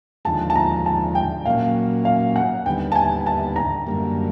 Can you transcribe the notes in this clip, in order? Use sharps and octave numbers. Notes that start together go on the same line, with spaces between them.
D#2 D3 F3 G#3 A5
A5
A#5
A5
G5
A#2 F#3 A#3 C#4 F5
F5
F#5
D#2 D3 G3 B3 G5
A5
G#5
A5
A#5
F#2 D3 G3 A#3